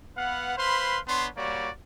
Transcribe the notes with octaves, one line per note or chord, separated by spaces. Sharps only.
B3 B4 F5 F#5
B4 C5 F5 B5 C6
B3 D4 C#5 C6
G3 A#3 F#4 C#5 D5